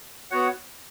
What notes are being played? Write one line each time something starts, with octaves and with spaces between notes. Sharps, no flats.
B3 F#4 C#5 F#5